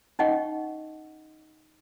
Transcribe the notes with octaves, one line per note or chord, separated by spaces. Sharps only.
C#4 D#4 D#5 F#5 G5 C#6